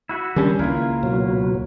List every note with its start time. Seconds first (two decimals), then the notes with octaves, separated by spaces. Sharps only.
0.09 E4 F#4 E5
0.36 D3 D#3 G3 C#4 D4
0.59 C#2 A#3 E4 F4 A#4
1.03 B2 F#3